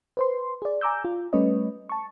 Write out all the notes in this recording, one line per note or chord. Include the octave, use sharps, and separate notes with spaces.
B4 C5 C6
G#4 D5
G#5 A#5 D6 E6 G6
F4
G3 A3 C#4 B4 C#5 D#5
A5 C#6